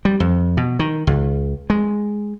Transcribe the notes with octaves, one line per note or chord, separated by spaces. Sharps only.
G3
F2
B2
D#3
C#2
G#3